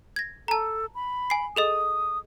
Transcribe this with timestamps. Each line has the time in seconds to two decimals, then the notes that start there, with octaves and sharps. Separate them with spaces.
0.16 G#6 A#6
0.48 A4 A5 A#5
0.95 B5
1.30 G#5 C7
1.56 G#4 A4 D#5 D#6